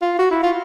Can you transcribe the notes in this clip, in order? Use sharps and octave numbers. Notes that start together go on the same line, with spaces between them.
F4
F#4
E4
F4